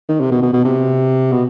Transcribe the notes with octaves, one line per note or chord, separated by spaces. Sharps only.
D#3
C3
B2
B2
B2
C3
B2